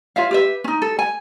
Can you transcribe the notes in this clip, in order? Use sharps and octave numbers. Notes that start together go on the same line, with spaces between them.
F4 C#5 E5 F5
G4 B4 E5
C#4 D#4
A4
G#5